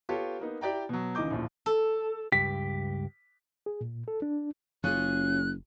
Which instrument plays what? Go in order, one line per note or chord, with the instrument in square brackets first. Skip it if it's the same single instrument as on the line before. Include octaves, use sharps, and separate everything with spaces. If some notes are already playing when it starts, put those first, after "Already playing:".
[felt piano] B3 F4 G4 A4 C#5
A#3 B3 D#4
E4 G4 D5 G5 A#5
B2 F#3
C#2 D#3 E3 D#5 D6 G6
A#1 D#2 A2
[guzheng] A4
[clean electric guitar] C#2 G2 G4 [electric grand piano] B6
[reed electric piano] G#4
A#2
A4
D4
[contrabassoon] F#1 [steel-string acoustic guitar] C#4 F4 G#4 [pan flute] F#6